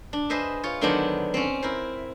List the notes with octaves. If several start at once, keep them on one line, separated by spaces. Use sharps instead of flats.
D4
G#4 B4 C5 D#5 E5
F4 C#5
D3 D#3 F#3 B3 D4 C5
C4 C#4
E4 A#4 C5